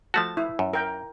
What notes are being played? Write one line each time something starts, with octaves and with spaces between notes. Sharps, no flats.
F3 A3 F#4 A5
E4
F#2
A#4 G5